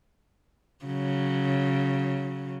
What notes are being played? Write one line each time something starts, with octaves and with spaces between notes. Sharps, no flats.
C#3 F#3